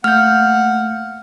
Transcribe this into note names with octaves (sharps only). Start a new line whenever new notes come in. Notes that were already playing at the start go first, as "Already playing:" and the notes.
A3 A#3 F#5 F6 G6